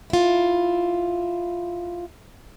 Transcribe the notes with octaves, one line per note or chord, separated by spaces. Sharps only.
E4 F4